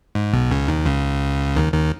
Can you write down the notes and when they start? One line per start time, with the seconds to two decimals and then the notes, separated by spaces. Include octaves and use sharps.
0.15 G#2
0.33 B1 B2
0.51 C#2 C#3
0.68 D#2 D#3
0.85 C#2 C#3
1.56 D#2 D#3
1.73 D#2 D#3